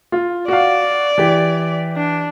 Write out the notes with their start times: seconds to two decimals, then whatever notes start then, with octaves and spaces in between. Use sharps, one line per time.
0.12 F4
0.48 F#4 D5 F5
1.18 E3 G4
1.96 D4